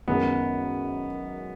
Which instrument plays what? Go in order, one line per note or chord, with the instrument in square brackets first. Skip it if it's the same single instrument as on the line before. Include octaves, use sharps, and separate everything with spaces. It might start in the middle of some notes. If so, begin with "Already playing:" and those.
[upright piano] F#2 D#3 G#3 C#4 [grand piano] B3